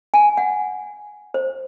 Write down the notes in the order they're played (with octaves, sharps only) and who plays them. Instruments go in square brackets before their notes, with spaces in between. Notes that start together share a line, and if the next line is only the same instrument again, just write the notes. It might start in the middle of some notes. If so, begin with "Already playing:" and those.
[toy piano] G#5
F#5
C5